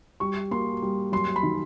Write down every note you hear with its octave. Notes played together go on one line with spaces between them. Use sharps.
G3 C#6
A#3 C6
G3
F#2 C6
B5
D#3